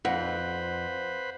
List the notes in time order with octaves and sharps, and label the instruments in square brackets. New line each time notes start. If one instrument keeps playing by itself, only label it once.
[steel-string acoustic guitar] F2 [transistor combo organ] B4 C5 B5 [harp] F#5